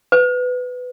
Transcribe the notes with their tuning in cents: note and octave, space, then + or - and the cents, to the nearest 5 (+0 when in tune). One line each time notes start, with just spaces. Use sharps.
B4 +15